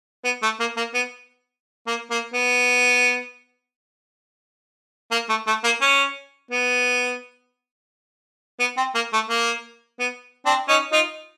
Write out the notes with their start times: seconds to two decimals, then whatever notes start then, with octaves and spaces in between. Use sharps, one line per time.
0.25 B3
0.43 A3
0.60 A#3
0.77 A#3
0.94 B3
1.87 A#3
2.11 A#3
2.34 B3
5.12 A#3
5.29 A3
5.47 A3
5.64 A#3
5.82 C#4
6.51 B3
8.60 B3
8.77 C4
8.95 A#3
9.13 A3
9.30 A#3
10.00 B3
10.46 C4 D4
10.68 C#4 D#4
10.92 D#4 F4